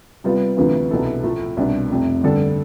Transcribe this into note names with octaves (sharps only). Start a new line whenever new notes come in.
C3 G3 B3 F4
D2 C3 E3 B3 F4
C2 B2 B3 E4 A4
A2 F3 A3
C2 B2 G3 D4
F1 F2 C3
G2 D3 G3 D4 A4